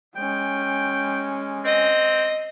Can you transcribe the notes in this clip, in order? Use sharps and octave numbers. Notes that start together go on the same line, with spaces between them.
G#3 C#4 G5
C4 D#5